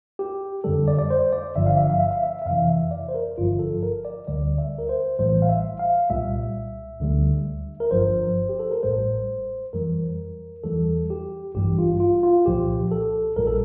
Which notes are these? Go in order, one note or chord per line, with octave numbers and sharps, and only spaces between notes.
G4
F2 D3 G3 A4
D5
D5
C5
D5
G1 G2 D3 F3 E5
F5
E5
F5
E5
F5
E5
E5
F2 C3 E3 F5
E5
D5
C5
A#4
G1 G2 D3 F3 F4
A4
A#4
D5
D2 D3 G3 D5
E5
A#4
C5
A1 A2 E3 G3 C5
F5
E5
F5
C2 A#2 G3 E5
D2 D3 G3
A#4
G1 G2 F3 C5
G4
A4
A#4
A1 A2 G3 C5
F2 E3 G3 A#4
E2 E3 G3 A4
G4
A1 G2 E3 G3 G4
F4
F4
F4
C2 A#2 F3 G4
A4
A#1 A#2 G3 A#4
A4